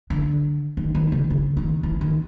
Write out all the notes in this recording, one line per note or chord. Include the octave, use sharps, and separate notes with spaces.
D3
D#3
D#3
C#3
C#3
D#3
E3
D#3